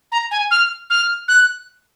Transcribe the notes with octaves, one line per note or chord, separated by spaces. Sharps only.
A#5
G#5
F6
F6
F#6